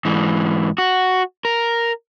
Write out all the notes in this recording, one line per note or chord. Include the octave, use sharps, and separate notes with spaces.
G#2 E3
F#4
A#4